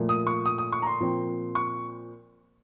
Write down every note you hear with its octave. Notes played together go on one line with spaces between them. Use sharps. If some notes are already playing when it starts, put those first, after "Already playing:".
Already playing: A#2 F3 A3
D#6
C#6
D#6
D#6
C#6
A#5
C6
A#2 F3 C4
C#6